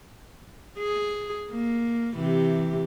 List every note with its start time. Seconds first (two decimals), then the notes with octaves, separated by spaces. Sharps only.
0.79 G#4
1.52 A#3
2.16 C3 E3 G4